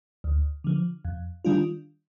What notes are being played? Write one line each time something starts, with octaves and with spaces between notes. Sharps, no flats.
D2
D3 F3
F2
D#3 G3 D4 F4